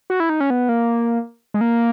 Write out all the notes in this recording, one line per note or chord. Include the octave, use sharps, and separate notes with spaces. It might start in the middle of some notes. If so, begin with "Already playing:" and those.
F#4
E4
D#4
C#4
B3
A#3
G#3
A#3